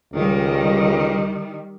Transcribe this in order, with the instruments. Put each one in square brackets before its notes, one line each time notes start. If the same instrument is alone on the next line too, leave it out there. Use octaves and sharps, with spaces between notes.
[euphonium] C#2 [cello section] D#3 G3